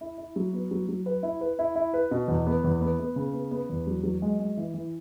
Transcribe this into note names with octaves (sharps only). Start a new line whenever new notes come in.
E4
E4
F#3
B3
F#3
F#3
B4
E4
B4
E4
E4
B4
B2
E2
B3
E2
B3
B3
C#3
B3
B3
E2
F#3
F#3
G#3
G#3
E3
E3